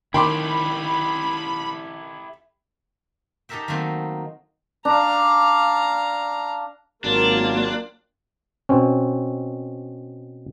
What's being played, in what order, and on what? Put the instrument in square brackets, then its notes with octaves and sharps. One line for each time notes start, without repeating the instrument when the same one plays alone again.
[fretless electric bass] D#3 [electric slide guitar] E4 G4 A4 [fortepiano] G5 C6 D6 [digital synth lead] B5
[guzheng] D#4 G4 A4 A#4 E5 G5
D#3 F#3 A3 A#3 C4
[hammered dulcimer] D4 [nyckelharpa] F5 A#5
[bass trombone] G#1 [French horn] F#3 [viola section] A#3 F4 G4 [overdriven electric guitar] D4
[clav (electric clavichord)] B2 C4 C#4